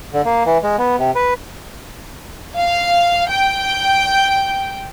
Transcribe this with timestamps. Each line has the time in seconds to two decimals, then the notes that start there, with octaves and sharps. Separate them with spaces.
0.13 D3
0.25 A#3
0.46 E3
0.63 G#3
0.78 B3
0.99 C3
1.15 B4
2.58 F5
3.30 G5